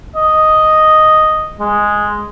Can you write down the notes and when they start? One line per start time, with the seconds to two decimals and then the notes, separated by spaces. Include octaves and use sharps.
0.15 D#5
1.59 G#3